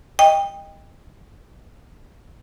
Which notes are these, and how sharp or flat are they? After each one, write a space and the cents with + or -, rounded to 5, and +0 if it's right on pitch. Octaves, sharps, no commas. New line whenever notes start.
D#5 +0 G5 +25